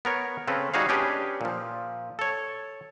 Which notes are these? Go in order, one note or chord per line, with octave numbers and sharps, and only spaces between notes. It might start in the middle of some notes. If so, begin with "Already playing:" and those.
B3 A#4 C#5
C#3 C4 C#4 A4 B4
G3 D#4 F#4 G#4 C#5 F5
C#4 D4 G4 G#4 B4
A#2 F3
A4 C#5